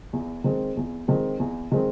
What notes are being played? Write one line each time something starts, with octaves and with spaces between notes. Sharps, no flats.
E2
D#3 G#3 C4
E2
D#3 G#3 C4
E2
D#3 G#3 C4